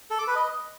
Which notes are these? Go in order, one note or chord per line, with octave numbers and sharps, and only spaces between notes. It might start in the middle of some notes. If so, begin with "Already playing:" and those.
A4
D6
B4
D#5